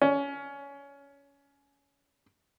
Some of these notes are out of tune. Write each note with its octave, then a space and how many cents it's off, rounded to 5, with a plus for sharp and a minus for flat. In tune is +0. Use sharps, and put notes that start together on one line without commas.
C#4 +20